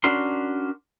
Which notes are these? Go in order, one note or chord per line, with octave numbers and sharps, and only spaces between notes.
C#4 D4 F#4 A#4 C6